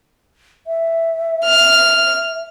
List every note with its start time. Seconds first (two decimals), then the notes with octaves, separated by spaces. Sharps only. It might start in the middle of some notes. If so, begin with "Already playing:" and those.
0.67 E5
1.45 F6